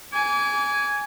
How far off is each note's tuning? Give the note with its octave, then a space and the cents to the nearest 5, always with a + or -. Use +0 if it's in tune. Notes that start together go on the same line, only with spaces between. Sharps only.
G#5 +0 D6 -35